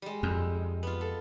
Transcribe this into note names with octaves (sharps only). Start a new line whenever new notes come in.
G3 G#3
F2
B3 F4
A4